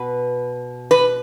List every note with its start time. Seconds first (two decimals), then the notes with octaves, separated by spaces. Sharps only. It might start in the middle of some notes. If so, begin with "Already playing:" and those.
Already playing: B2 B4
0.91 B4